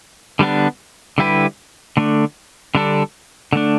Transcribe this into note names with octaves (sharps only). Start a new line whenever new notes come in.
D3 G3 B3 D4
D3 G3 E4 G4 B4
D3 A3 D4
D3 G3 D4 A4
D3 A3 D4